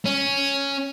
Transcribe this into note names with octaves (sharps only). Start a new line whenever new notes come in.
C#4